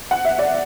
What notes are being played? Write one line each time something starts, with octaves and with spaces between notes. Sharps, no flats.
F#5
E5
D5